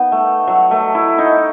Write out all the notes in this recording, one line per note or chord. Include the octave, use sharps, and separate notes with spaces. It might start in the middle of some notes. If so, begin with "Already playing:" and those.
Already playing: B3 D#4
A3
F#3
A3
E4
D#4